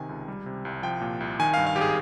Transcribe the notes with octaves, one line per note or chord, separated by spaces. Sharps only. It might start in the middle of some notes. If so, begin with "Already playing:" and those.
Already playing: C3 D#3 G#5
C#2
G3
C3
C2
F3 G5
A#2
C2
D#3 G#5
G2 F5
F5
G#1 G4
G#4